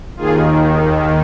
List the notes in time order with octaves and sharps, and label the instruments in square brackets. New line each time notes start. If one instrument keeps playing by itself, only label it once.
[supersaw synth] D#2 D#3 F4 G#4